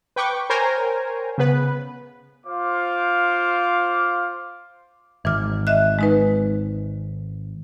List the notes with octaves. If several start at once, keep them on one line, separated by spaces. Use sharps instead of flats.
B4 G5 C#6 D6
A#4 C5 C#5 G5 G#5 A#5
C#3 B3 B4
F4 C5 F5 D6
G#1 E3 D6 F6
D#5 E5 F#6
G#3 D#4 B4